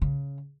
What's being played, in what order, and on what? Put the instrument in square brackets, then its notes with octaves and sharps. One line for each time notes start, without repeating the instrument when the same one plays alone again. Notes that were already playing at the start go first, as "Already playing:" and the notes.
[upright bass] C#3